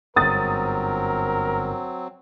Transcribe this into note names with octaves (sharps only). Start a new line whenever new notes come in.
G1 G#2 F#3 C4 A#4 D#6 A6